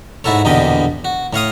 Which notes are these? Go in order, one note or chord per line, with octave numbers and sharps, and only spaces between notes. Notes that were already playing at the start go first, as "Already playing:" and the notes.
G#2 E4 F#4 A4 C#5
A#1 E2 B2 D3 G4 D#5
F#4
A2 C#5 F5 D#6